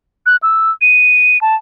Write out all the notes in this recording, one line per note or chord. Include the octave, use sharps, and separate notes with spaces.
F#6
E6
D#7
A5